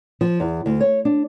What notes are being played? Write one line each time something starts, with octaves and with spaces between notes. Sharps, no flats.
F3
E2
D2
C#5
D4